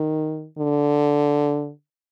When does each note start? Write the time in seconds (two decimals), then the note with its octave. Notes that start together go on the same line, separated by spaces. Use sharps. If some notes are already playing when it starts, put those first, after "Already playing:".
Already playing: D#3
0.59 D3